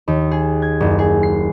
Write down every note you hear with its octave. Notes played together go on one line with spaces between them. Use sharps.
D#2
G#4
G#6
F#1
G#4
C7